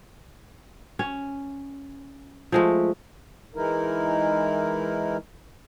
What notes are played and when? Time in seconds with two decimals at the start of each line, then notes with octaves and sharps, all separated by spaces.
0.99 C#4
2.52 F3 G#3 A3
3.55 E3 G#3 D#4 E4 A#4